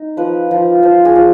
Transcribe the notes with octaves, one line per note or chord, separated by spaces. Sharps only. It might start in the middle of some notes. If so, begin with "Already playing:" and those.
Already playing: D#4
F3 B4
F3
F3 C5
G#4
F3